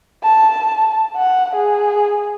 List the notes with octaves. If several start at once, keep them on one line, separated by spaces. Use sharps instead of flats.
A5
F#5
G#4